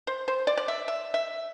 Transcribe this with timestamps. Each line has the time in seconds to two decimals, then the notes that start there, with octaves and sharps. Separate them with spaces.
0.07 C5
0.28 C5
0.47 D5
0.57 D5
0.68 E5
0.88 E5
1.14 E5